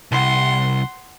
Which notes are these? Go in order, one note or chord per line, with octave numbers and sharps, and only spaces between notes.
C2 F#5 C6